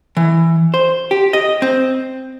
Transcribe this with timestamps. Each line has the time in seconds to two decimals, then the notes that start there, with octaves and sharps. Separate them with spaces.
0.17 E3
0.74 C5
1.11 G4
1.33 D#5
1.62 C4